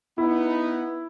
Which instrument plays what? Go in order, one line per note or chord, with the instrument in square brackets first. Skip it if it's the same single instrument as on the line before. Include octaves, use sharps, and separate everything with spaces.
[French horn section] B3 [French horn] D#4 [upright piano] E4